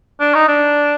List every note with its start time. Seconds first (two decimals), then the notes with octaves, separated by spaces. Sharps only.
0.20 D4
0.35 D#4
0.48 D4